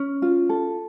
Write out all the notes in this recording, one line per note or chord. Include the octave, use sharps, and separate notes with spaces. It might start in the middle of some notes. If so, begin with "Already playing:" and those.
Already playing: C#4
F4
A4